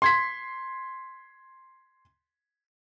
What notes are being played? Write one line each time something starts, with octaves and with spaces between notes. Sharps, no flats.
C6 G#6 B6